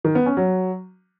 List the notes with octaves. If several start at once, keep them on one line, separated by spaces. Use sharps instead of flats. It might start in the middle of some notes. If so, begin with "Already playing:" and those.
D#3
B3
C#4
F#3